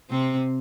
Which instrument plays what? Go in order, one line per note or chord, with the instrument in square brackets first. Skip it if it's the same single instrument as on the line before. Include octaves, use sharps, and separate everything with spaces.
[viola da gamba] C3 C4